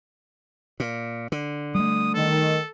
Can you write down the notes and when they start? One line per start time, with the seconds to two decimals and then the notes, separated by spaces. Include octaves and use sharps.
0.80 A#2
1.32 D3
1.75 G3 A3 D#6
2.14 D#3 A4